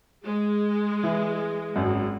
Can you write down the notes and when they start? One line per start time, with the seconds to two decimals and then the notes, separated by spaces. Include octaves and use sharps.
0.24 G#3
1.03 E3
1.76 G#1 F#2